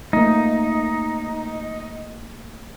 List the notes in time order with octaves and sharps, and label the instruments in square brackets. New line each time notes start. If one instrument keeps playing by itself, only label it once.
[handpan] A3 A#3 [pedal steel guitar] D#4